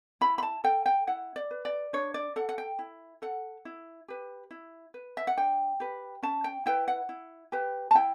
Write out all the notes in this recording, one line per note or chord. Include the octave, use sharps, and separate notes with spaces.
E4 B5
B5
A5
A4 G5
G5
E4 F#5
D5
B4
D5
D4 C#5
D5
A4 F#5
F#5
G5
E4
A4 F#5
E4
G4 B4
E4
B4
E5
F#5
D4 G5
G4 B4
C#4 A5
G5
E4 B4 G5
F#5
E4
G4 B4
A5
E4 G5